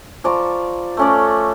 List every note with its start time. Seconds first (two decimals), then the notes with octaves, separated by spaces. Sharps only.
0.24 F3 D5 A#5 C#6
0.97 A3 C#4 D5